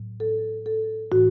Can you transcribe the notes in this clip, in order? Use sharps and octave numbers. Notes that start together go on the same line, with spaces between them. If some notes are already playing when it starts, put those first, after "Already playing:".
Already playing: A2 F#3
A4
A4
A2 E3 F#4